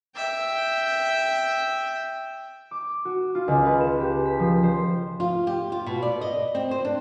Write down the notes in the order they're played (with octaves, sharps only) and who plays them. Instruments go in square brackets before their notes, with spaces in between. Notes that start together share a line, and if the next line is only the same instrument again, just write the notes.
[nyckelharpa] E5 G5
[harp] D6
F#4
F4
C#2
B4
E7
G4
B6
F3
C5
[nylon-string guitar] F4
G4
F4
B2
D5
D#5
C4
C5
D4